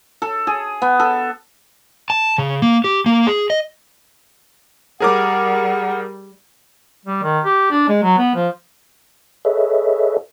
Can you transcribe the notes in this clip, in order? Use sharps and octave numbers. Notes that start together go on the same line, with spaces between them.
A4
G#4
B3
A4
A5
C#3
A#3
G4
A#3
G#4
D#5
G3 G#4 A#4 F#5 D6
G3
D#3
G4
D4
G#3
F#3
B3
F3
G#4 A4 B4 C#5 D#5 E5